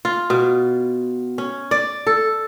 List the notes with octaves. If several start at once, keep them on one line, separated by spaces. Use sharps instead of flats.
F4
B2
C#4
D5
A4